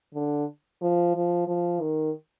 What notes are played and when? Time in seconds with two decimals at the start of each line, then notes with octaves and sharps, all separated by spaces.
0.14 D3
0.81 F3
1.15 F3
1.47 F3
1.81 D#3